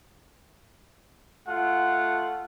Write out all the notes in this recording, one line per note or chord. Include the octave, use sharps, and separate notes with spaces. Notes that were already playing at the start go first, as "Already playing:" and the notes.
A3 F4 F#5